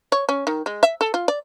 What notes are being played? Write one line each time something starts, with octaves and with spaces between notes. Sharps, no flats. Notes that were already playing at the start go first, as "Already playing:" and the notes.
C#5
C#4
D#3
G#3
E5
A4
F4
D5